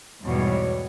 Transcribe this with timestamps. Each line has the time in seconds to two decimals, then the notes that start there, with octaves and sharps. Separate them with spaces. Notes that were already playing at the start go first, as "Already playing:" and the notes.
0.23 E2 G#2 B2 G3 C#5